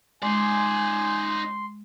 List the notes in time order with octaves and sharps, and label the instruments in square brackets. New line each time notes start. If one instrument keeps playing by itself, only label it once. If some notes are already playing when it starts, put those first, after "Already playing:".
[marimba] G#3 [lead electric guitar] D#4 D5 [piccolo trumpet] G#5 [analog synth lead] C6